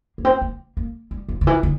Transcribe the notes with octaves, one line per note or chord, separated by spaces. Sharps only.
A#3
C4
A#3
A#3
G3
F3
D3
E3
D3